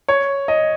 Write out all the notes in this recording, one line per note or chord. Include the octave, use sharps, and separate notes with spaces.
C#5
D#5